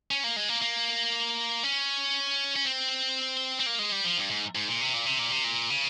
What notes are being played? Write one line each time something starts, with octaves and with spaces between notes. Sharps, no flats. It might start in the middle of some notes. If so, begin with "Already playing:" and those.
C#4
A#3
G#3
A#3
A#3
C#4
C#4
C4
C4
A#3
G#3
G3
F3
G2
G#2
G#2
A#2
C3
A#2
C3
A#2
C3
A#2
C#3